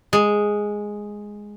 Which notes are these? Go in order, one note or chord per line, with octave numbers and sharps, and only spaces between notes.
G#3